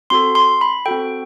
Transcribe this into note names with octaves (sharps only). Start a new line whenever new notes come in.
C4 F#4 A4 C6
C6
B5
C4 F#4 A4 G5